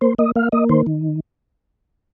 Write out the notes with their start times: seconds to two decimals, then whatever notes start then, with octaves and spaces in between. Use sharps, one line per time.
0.01 A#3 C5
0.18 A#3 D#5
0.36 A#3 F5
0.52 A#3 D#5
0.69 D#3 C5
0.86 D#3